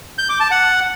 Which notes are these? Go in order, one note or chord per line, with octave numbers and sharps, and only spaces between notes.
G6
D6
A5
F#5